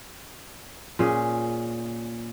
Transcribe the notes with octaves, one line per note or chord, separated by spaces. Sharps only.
A#2 C#4 G#4